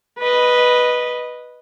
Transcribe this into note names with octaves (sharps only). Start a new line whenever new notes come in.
B4 D#5